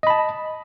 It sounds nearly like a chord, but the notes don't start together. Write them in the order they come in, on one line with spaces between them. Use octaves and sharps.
D#5 B5 A5